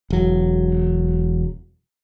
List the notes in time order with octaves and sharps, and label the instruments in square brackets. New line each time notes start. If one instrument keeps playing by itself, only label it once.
[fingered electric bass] E1 F#3